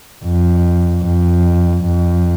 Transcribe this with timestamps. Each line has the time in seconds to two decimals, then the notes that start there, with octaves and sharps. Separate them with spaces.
0.25 F2
1.05 F2
1.86 F2